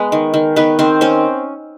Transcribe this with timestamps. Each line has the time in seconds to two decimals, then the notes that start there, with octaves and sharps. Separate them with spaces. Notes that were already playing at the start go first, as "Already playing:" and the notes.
Already playing: G#3 B3 B4
0.12 D#3
0.34 D#3
0.56 D#3 B3 B4
0.79 D#3 C4 C5
1.01 C4 C#4 C5